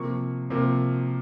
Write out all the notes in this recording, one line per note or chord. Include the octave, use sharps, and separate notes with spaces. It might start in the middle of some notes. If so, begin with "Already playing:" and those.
Already playing: C3 F3 A#3 C#6
C3 F3 A#3